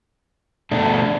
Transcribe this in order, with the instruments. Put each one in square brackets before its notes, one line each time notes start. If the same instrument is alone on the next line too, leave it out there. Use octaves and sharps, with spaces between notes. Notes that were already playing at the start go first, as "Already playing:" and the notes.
[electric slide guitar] B2 A3 D4